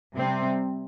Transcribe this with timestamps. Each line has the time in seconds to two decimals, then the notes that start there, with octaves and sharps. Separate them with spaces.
0.16 C3 G3 C4